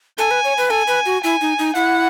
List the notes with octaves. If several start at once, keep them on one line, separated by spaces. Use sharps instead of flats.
A4 G#5
B4
C#5
B4
A4 G#5
B4
F#4
E4 G#5
D#4
D#4
E4 F#5